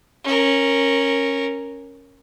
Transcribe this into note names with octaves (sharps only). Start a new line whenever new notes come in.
C#4 A#4